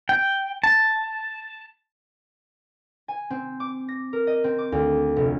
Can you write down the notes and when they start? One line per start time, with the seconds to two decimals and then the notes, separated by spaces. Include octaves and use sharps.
0.09 G5
0.64 A5
3.08 G#5
3.30 C4
3.60 D6
3.89 A#6
4.13 A#4
4.27 D#5
4.44 C4
4.59 D6
4.72 D2
5.16 F1